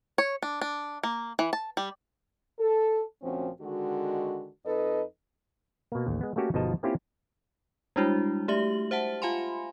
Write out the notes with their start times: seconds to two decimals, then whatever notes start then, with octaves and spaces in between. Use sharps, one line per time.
0.18 C#5
0.42 D4
0.61 D4
1.03 A#3
1.39 E3
1.53 A5
1.77 G3
2.59 A4
3.22 D2 A#2 F3 C4 C#4 F#4
3.61 D3 D#3 G#3 F#4
4.65 F2 D#4 A4 B4 D#5
5.92 B2 A#3
6.07 A1 D#2
6.21 G#3 B3
6.36 A3 A#3 C#4 F#4 G4 A4
6.54 G1 B2 F3 D#4 D#5 A5
6.83 A#3 C4 C#4 E4 F4 G4
7.96 G3 G#3 D4 E4 F#4
8.48 A3 G4 E5 F#7
8.91 C5 E5 F#5 A5
9.22 F4 F5 G#5 B5 C6